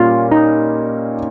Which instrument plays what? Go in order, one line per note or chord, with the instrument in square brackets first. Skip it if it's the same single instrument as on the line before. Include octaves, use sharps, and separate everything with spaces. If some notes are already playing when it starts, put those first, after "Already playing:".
Already playing: [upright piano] A#2 G3 A#3 C#4 [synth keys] F4
[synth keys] D#4